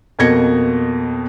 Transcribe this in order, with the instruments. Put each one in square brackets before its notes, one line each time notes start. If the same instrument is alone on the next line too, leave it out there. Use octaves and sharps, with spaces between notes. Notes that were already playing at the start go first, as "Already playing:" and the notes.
[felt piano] F2 B2 A#3 G#6 A#6 C#7